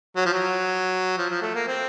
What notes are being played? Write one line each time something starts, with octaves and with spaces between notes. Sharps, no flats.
F#3
F3
F#3
F3
F3
A3
A#3
C4